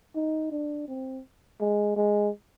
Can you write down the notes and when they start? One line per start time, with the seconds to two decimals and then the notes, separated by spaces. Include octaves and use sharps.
0.15 D#4
0.51 D4
0.88 C4
1.60 G#3
1.96 G#3